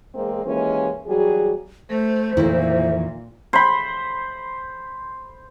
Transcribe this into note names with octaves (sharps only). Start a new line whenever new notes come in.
E2 G#3 A#3 C4
D#2 E3 G#3 A#3 C#4
E2 F#3 G3 F#4 G#4
A3 C5
F2 A#2 D#3 E3 A3 E4
C5 B5